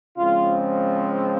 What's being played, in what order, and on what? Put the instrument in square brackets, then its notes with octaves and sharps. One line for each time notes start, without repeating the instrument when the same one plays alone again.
[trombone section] C#3 F3 G#3 C4 F4